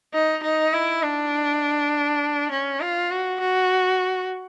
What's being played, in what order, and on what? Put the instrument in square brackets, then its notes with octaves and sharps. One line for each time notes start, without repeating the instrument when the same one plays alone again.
[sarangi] D#4
D#4
E4
D4
C#4
F4
F#4
F#4